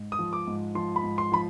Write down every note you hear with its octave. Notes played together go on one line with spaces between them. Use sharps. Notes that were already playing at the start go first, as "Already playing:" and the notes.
Already playing: G#2
D#6
F3
D6
G#2
F3 C6
B5
G#2
C6
F3 B5